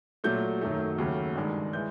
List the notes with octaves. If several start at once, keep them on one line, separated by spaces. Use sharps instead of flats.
A#2 F#3 A3 G6
F#2 D#3 F#3 A3
D#2 C#3 F#3 A3
G2 D#3 G#3
E3 G#3 G6